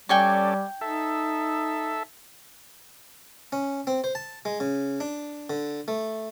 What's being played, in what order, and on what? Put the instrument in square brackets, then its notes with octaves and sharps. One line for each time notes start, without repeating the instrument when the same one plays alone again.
[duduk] G3 [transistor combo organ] C#4 A4 D5 [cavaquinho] G5 G#5 C#6
[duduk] D#4 [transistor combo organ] A4 E5
[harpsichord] C#4
C4
C5
A5
G#3
C#3
D4
D3
A3